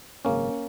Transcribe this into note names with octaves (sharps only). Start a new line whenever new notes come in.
G#1 F#2 C#3 A#3 C#4